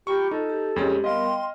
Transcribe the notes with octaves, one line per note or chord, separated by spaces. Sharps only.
F4 G4 A#5 B5 C#6
D#4 F4 A4
G4
F2 G#3 C4 C#4 G4
G3 B3 A#4 D#5 F5 C6
G5